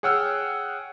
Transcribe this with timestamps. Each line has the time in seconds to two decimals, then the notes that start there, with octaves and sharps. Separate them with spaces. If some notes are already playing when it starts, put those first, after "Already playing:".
0.03 G#4 C#5 F#5 G5 E6 F6